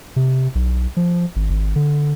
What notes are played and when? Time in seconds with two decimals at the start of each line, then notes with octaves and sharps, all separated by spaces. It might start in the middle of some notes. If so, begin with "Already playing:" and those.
0.16 C3
0.55 B1
0.97 F3
1.36 G#1
1.50 G#1
1.76 D3